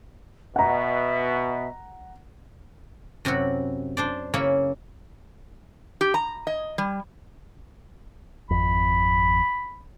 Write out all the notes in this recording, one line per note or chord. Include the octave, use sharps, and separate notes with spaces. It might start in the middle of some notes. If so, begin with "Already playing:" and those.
B2 E5 F#5 A#5
F#2 C3 E4 F#4
D4 C5 D5
C#3 A#3 E4 C#5 B5
G4
A#5
D#5
G3
G#1 F2 B5